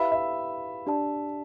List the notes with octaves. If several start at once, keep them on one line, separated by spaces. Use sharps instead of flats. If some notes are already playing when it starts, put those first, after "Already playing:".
Already playing: E4 G4 B4 E5 F5 B5
E5
D4 G4 D5 A5